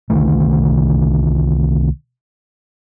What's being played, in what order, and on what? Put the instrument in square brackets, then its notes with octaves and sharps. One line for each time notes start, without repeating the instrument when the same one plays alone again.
[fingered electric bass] C2 D3 D#3 A3